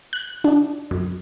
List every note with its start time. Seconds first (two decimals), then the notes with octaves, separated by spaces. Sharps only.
0.13 F#6
0.44 D4
0.91 F#2